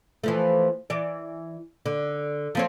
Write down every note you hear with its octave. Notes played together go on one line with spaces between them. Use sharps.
E3 F3 A3
E3 D5
D3
F3 C4 C#5